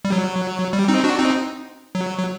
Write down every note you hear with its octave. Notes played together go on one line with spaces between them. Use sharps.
G3
F#3
G3
C4 D#4
D4 F#4
C4 D#4
F#3
F#3